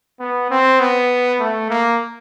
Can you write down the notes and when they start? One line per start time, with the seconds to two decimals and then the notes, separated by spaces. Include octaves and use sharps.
0.20 B3
0.50 C4
0.80 B3
1.40 A3
1.70 A#3